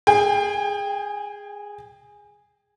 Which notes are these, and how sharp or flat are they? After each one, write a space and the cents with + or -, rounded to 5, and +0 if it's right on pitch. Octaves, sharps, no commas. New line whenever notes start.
G#4 -10 G5 +25